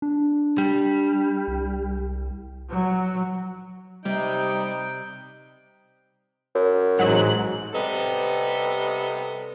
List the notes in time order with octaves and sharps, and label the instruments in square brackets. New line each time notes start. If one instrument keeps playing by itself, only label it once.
[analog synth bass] D4
[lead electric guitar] G3
[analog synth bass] C2
[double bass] F#3
[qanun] C3 [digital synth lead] G3 [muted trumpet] D#4 [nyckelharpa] G5
[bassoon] F#2
[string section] A1 F#6 [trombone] G#2 [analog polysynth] F#3
[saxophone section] C3 G3 B3 A4 D#5